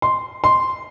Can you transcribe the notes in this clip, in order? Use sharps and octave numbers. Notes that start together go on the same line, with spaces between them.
C6
C6